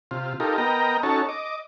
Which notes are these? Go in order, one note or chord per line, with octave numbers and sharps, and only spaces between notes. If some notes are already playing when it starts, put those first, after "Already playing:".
C3 F4
D#4 F4 G4 A4 A#4
B3 A#4 D#5 G5 A#5
C#4 D#4 F#4 A4 C#5 A5
D#5 D6